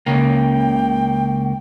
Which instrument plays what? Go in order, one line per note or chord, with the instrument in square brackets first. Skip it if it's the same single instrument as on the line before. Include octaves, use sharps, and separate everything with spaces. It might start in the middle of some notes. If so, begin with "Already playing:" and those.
[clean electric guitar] C#2 C#3 A#3 [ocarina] G5